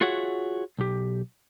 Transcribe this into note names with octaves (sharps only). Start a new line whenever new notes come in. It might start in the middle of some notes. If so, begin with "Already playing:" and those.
F4 F#4 G#4 C#5 E5 F#5
B1 G4